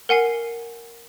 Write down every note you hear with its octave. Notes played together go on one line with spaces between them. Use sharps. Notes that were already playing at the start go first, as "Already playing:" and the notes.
A#4 F#5 G#5 C7